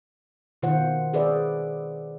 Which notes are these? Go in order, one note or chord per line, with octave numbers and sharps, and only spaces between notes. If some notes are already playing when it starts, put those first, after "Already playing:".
B2 D#3 F4 C5 F#5
G#4 B4 C5 D5 E5